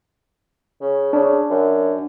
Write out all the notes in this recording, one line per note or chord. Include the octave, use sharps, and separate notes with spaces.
C#3
C#3 D4
F#2